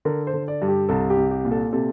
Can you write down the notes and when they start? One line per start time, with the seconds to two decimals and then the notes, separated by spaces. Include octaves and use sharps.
0.05 D3 A#4
0.27 C5
0.34 D3
0.48 D5
0.62 G2
0.68 G4
0.89 C2 A4
1.10 G4
1.17 C2
1.31 G4
1.45 A#2
1.51 A4
1.73 C3 A4